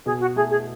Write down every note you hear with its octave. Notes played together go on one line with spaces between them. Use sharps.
B2 G#4
F#4
A3 E4 G#4
G#4